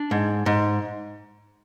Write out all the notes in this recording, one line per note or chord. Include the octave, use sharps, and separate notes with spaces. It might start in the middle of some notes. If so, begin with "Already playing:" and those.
Already playing: D4
G#2
G#2